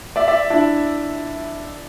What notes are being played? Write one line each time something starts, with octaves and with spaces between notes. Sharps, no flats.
D5 E5
D5 E5
D4 E4